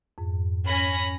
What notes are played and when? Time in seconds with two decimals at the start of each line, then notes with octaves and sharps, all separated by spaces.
0.18 F2 G#2
0.66 C#4 B5 A#6